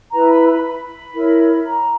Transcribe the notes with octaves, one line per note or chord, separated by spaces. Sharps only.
E4 B4 A#5
B5
B5
B5
E4 A#4 C#5
A#5